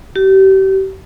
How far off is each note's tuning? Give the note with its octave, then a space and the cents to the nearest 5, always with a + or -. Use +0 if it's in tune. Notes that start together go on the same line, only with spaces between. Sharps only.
G4 -35